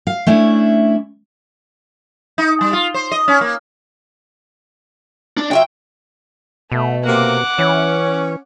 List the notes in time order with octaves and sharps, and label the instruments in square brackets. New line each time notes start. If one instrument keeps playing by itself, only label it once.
[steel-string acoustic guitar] F5
A3 C#4 D4 E4
[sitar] D#4
G3
F4
C5
D#5
C#4
A#3
[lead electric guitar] D4
[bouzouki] F#3 F4 E5 [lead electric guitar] G5
[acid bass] B2 [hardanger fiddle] A3
[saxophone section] C3 A#3 [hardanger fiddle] F#5 D6
[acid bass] E3 [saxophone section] C#4 C#5